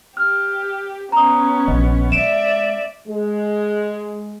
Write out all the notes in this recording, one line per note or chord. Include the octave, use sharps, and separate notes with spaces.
G4 F6
B3 C#4 A#5 D#6
A#1 D#5
G#3 D5 E5 D7 E7
G#3